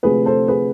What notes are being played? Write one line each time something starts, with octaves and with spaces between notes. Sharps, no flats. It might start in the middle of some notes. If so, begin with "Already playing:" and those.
D2 C3 F3 G#4 B4
A4 C5
G#4 B4